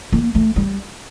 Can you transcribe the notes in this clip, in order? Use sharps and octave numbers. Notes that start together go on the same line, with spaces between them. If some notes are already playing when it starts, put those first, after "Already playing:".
A#3
A3
G3